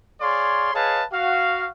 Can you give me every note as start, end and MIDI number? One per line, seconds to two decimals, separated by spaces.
0.21 0.71 68
0.21 0.71 73
0.21 0.71 74
0.21 0.71 77
0.21 0.71 84
0.74 1.04 68
0.74 1.04 71
0.74 1.04 73
0.74 1.04 75
0.74 1.04 77
0.74 1.04 81
1.12 1.68 66
1.12 1.68 77